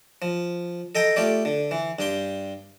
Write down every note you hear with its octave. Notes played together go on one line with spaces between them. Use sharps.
F3
A4 D#5 G5 A#5
A3 F4 G4 D5
D3
E3
G2 G4 C6